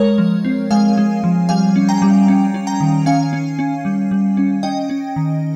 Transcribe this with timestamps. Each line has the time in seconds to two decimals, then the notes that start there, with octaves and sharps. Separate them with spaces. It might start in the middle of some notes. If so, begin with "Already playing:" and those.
Already playing: G#3 A#4 C#5
0.18 F3
0.45 C4
0.71 G#3 F5 G#5
0.98 G#3
1.24 F3
1.49 G3 F5 G#5
1.76 C#4
1.89 G5 A#5
2.02 G3
2.28 C#4
2.54 C#4
2.67 G5 A#5
2.80 D#3
3.06 C#4 F5 G#5
3.33 C#4
3.59 C#4
3.85 G3
4.11 G3
4.37 C#4
4.63 C#4 D#5 G5
4.90 C#4
5.16 D#3